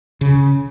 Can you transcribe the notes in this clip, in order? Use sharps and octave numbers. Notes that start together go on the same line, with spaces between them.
C#3